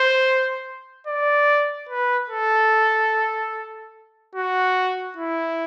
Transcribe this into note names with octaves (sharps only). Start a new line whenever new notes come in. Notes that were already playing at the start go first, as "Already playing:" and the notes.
Already playing: C5
D5
B4
A4
F#4
E4